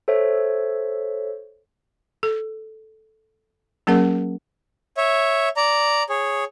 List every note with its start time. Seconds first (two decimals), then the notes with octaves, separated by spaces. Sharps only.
0.08 A4 C5 C#5 E5
2.23 A4
3.87 F#3 A#3 C#4 G#4 A#4 F#5
4.97 C#5 E5
5.57 D5 A#5
6.09 G#4 C#5